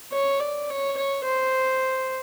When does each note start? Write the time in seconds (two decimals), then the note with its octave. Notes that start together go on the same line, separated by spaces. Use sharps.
0.13 C#5
0.40 D5
0.70 C#5
0.97 C#5
1.25 C5